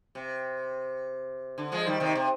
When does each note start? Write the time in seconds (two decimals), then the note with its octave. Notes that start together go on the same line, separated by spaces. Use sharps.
0.15 C3
1.58 D3
1.72 F3 G#3
1.87 D#3 G3
2.00 C3 D#3
2.15 C3